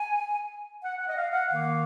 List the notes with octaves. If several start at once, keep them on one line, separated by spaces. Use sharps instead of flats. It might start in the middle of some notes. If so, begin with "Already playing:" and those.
Already playing: G#5
F#5
F#5
D#5
F5
F#5
D#3 A#3 F5